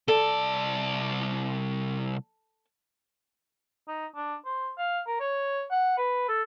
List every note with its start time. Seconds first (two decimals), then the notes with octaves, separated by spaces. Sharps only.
0.08 C2 A4 D5
3.88 D#4
4.16 D4
4.45 C5
4.78 F5
5.07 A#4
5.20 C#5
5.71 F#5
5.98 B4
6.29 A4